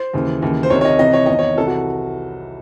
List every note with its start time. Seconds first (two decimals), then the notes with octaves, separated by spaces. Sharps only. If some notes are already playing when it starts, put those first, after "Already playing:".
Already playing: C5
0.13 D#2 C#3 E3
0.42 D#2 C#3 E3
0.63 C5
0.70 C2 C3 D#3 C#5
0.81 C#5
0.85 D#5
0.99 C2 C3 E3 D#5
1.13 C#5
1.26 E2 D#3 D#5
1.39 C#5
1.57 C2 C3 E3 A4
1.67 F#4